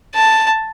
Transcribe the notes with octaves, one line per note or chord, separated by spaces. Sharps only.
A5